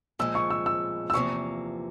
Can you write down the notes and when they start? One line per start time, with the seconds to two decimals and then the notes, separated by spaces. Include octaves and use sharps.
0.19 A#2 F3 G#3 E6
0.35 C#6
0.50 E6
0.66 E6
1.10 E6
1.13 E2 C3 F3 A#3 C#6